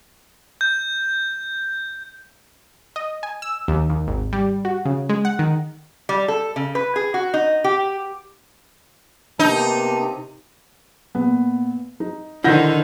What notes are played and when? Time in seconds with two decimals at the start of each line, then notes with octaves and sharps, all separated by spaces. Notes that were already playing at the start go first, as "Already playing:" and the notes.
0.61 G6
2.96 D#5
3.23 G#5
3.42 E6
3.68 D#2
3.89 D#2
4.08 G#1
4.33 G3
4.65 F#4
4.85 C#3
5.09 G#3
5.25 F#5
5.39 D#3
6.09 G3
6.28 A4
6.56 C#3
6.75 B4
6.96 G#4
7.14 F#4
7.34 D#4
7.64 G4
9.39 C3 A#3 B3 D#4 A5
11.15 A#2 B3
12.00 D#4
12.44 D3 D#3 E4 C5 F#5 G6 A#6